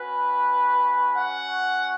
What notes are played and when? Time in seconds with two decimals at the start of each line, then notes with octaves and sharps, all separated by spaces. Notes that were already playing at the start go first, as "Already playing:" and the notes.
Already playing: C#4 F#4 B4
1.17 F#5